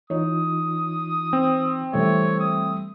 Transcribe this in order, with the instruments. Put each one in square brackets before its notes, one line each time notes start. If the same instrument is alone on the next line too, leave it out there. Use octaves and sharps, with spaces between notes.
[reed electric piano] E3 D#4 F4 [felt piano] C#5 [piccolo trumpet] D#6
[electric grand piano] C4
[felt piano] E3 A3 [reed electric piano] G3 [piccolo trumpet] C#5
[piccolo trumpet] D#6